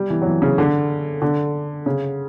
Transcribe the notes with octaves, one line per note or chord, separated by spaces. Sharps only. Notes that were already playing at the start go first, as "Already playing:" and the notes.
Already playing: G3
E3
F#3
E3
C#3
D3
D3
C#3